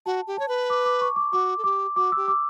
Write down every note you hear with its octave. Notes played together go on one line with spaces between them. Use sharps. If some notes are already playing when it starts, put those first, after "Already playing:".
F#4 A5
G4
C#5 A5
B4
D6
D6
C#6
D6
F#4 D6
A4
G4 D6
F#4 D6
G4 E6
D6